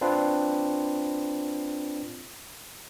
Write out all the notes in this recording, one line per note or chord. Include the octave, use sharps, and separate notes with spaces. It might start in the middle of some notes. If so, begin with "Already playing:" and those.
C4 D4 F4 B4